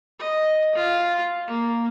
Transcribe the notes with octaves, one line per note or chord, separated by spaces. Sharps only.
D#5
F4
A#3